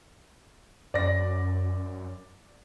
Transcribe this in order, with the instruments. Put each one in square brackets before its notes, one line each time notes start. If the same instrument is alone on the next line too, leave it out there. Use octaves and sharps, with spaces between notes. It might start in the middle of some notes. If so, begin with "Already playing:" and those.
[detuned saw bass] F#2 [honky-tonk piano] D5 A#6